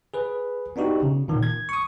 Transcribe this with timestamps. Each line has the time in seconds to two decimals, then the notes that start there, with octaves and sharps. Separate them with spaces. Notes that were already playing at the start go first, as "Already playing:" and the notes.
0.14 G#4 B4
0.76 B3 D4 D#4 F#4 G4
1.02 C#3
1.28 A#2 D#3
1.43 G#6
1.69 C#6 D#6